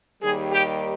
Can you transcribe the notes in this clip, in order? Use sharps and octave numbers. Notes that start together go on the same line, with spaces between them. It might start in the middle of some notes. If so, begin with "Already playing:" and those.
D#2 D#3 G3 G#4
G4